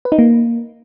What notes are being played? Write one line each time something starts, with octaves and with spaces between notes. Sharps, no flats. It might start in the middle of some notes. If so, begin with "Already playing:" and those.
B4
D#4
A#3